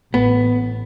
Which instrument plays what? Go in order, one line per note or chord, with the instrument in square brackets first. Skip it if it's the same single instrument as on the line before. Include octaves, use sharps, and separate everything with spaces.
[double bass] A1 [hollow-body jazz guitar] B3